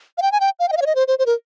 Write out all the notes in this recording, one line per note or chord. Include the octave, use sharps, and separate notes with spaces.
F5
G5
G#5
G5
F5
G5
D#5
F5
C#5
D#5
C5
C5
C5
A#4